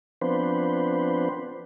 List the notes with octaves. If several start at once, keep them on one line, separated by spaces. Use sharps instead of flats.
F3 B3 C4 D4 B4 C5